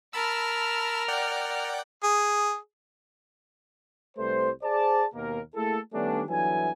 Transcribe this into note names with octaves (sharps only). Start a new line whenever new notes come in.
A#4 A5 B5 E6 F6
D5 F#5 G5
G#4
C2 G3 A3 B4 C5
G#4 C5 D5 A5
D#2 B2 A#3 A#4
A3 A#3 E4 G#4 A4
D#3 G3 A3 B3 C#4 D4
G1 D3 E3 F#3 E5 G#5